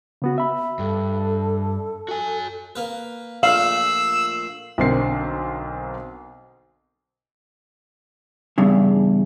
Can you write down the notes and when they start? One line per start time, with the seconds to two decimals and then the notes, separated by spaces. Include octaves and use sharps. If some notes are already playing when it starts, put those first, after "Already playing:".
0.22 C#3 B3 F#4
0.38 E5 B5
0.79 G2 A4
2.09 F#4 G#5
2.76 A#3 B4
3.43 A#1 A#2 A3 F5 E6 C7 E7 F#7
4.78 B1 D3 C4 A#4 C7
8.58 E2 G2 C#3